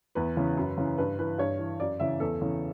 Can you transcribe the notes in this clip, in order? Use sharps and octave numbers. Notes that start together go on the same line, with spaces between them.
E2 B4
C#3 E3
F#2
C#3 E3
G2 B4
E3 B4
G2 C#5
E3
F#2 D5
C#3 E3 E5
E2 A4
C#3 E3